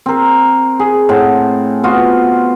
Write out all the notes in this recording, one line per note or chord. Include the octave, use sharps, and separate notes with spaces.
C4 A#4
G#4
A2 C4 F#5
B3 F4 F#4